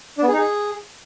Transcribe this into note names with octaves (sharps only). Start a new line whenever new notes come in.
D4
B3
G#4
D#4
G#4